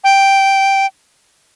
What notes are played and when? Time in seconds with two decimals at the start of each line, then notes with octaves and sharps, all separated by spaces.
0.04 G5